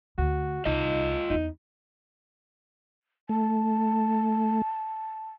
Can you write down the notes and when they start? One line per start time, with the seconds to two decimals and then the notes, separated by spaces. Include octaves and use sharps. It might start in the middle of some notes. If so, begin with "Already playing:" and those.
0.18 D2 F#4
0.65 C2 D#4 F4 D#5
1.30 E2 B3 D#4
3.29 A3 A5